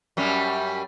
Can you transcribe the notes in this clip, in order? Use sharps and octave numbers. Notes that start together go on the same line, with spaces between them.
F#2 G3 C#4